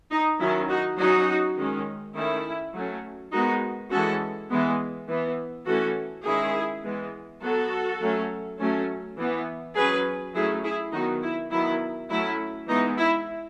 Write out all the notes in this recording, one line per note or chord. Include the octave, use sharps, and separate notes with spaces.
D#4
D#3 F#3 C#4 E4
D#4 F#4
F#3 C#4 D#4 F#4
D#3 G#3 C#4
D#3 A3 C#4 E4
F#3 A3 C#4
D#3 G#3 B3 D#4 F#4
E3 G#3 C#4 F#4 A4
E3 G#3 B3
E3 B3
E3 A3 C#4 F#4 A4
D#3 G#3 C#4 E4 G#4
E3 G#3 B3
F#3 B3 F#4 A4
F#3 A3 C#4
F#3 A3 C#4
E3 B3
F#3 C#4 G#4 B4
F#3 A3 C#4 E4 G#4
E4 G#4
D#3 F#3 B3 D#4 F#4
E4
D#3 F#3 B3 E4
F#3 A3 C#4 E4
E3 G#3 B3 D#4
E4